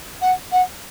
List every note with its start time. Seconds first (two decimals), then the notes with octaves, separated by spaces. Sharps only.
0.21 F#5
0.51 F#5